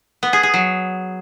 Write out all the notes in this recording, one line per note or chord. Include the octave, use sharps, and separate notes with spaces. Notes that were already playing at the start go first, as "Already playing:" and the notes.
B3
G#4
G#4
F#3